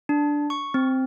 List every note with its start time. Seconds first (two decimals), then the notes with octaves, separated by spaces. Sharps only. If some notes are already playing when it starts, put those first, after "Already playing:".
0.09 D4
0.50 C#6
0.74 C4